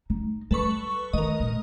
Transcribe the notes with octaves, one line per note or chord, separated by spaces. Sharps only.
D#4
F#2 G3 A4 B4 C#6
D#3 A#4 D#5
A#1